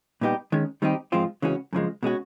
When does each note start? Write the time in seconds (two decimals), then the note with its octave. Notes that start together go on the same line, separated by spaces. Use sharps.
0.21 A#2 G3 B3 D#4 G4
0.52 D#3 G#3 C#4
0.82 D#3 G3 C4 D#4 G4
1.12 G#2 F3 G#3 C4 F4
1.42 C#3 E3 G#3 C#4 F#4
1.73 F#2 C#3 F3 G#3
2.03 B2 G#3 C#4 F#4